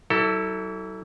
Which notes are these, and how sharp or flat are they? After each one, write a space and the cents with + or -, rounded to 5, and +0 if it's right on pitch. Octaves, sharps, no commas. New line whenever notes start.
F#3 +45 E4 -20 A4 +15